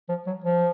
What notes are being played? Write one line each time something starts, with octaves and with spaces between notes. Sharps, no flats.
F3
F#3
F3